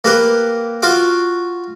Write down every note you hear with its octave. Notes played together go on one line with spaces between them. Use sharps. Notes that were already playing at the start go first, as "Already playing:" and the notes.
A#3 G4 B4
F4 F#4 F5 D6